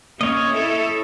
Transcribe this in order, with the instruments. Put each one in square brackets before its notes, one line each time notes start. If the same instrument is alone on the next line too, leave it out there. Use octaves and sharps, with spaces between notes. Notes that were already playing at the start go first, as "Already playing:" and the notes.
[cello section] A#3 C#4 [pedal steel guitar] C#5 D#5
[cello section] E4 A4